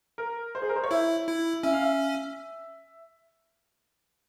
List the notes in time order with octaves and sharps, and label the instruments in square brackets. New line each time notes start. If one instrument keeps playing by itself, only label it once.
[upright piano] A#4
C5
G#4
A#4
C5
C#5
[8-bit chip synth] E4 [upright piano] E5
[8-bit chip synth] E4
[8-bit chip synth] C#4 [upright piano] E5
[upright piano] F5
E5